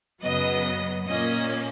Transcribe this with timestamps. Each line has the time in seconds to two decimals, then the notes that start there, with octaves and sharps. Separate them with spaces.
0.22 F#2 C#3 F#3 B3 D#5
1.06 A#2 A#3 C#4 D#5